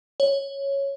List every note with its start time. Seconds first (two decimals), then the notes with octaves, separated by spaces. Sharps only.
0.20 C#5